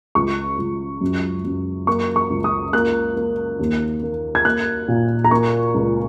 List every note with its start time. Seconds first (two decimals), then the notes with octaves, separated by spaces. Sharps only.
0.15 C#2 C#6
0.58 C#2
1.01 F#2
1.44 F#2
1.87 A#3 C#6
2.16 C#6
2.30 C#2
2.44 D#6
2.73 A#3 F#6
3.16 A#3
3.59 D#2
4.03 A#3
4.35 G#6
4.45 A#3 F#6
4.88 A#2
5.24 A#5
5.31 A#3 C#6
5.74 C#2